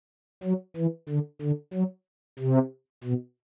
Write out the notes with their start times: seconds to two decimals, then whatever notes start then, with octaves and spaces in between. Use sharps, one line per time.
0.43 F#3
0.76 E3
1.09 D3
1.42 D3
1.74 F#3
2.39 C3
3.04 B2